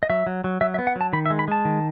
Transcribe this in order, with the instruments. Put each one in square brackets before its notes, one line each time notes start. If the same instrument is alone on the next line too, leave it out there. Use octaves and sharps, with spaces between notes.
[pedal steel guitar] D#5
F#3 E5
F#3
F#3
F#3 E5
E5
B3
F#5
F#3 A5
D#3 B5
E5
G#3
B5
G#3 A5
D#3